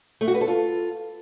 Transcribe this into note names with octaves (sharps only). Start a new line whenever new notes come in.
A3
F#4
B4
A4
F4